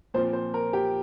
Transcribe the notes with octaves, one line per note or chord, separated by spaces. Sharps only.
A#2 F3 C4 C5
C5
A#4
G4